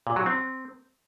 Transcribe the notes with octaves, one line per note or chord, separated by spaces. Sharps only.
A#2
F#3
C4